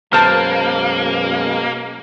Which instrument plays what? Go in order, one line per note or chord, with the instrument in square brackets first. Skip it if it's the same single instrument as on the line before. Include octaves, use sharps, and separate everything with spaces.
[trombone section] F#2 B2 G#3 [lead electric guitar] A#3 [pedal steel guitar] B4 F6 [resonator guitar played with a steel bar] C5 A5